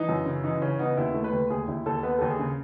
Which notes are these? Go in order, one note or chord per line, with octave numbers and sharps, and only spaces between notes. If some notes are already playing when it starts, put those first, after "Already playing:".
Already playing: E3 D#4
F#2
C#3
E3 D#4
C#3 C#4
B3 D#4
D#2 E4
A3
B4
D#2
D#2 G#4
D#2 E4
D#2 A4
B3 B4
D#2 A4
G#4
C#3